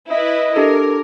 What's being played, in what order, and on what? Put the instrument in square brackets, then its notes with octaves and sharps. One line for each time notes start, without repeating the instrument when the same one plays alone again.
[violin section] E4 B4 [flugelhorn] D#5
[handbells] D4 G4 A4 [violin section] A#4